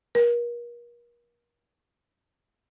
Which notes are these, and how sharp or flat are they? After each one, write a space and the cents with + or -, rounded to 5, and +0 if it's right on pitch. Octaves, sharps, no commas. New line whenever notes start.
A#4 +40